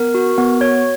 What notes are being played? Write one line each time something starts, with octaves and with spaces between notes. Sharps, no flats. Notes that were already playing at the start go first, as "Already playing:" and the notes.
Already playing: B3 A#4
F#4
B3
F#4 C#5